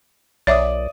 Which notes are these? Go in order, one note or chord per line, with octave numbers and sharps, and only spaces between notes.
B1 C#5 D5 E5 D6 D#6